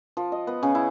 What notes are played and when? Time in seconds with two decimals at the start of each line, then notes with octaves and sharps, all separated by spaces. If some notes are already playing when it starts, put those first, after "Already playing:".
0.17 F3
0.32 D#5
0.47 B3
0.63 C#3
0.75 E4